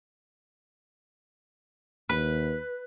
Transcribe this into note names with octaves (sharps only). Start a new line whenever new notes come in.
D#2 B4